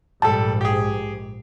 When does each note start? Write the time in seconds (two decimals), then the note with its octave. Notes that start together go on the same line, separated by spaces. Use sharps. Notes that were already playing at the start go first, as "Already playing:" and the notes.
0.22 A#1 G#2 G3 A4 A5
0.61 G4 G#4